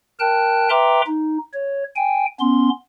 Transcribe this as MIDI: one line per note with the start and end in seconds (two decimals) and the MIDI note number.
0.20 0.70 70
0.20 0.70 79
0.20 0.70 81
0.20 0.70 90
0.70 1.02 71
0.70 1.02 76
0.70 1.02 79
0.70 1.02 82
0.70 1.02 84
0.70 1.02 86
1.07 1.38 63
1.53 1.84 73
1.96 2.26 79
1.96 2.26 80
2.40 2.70 59
2.40 2.70 61
2.40 2.70 84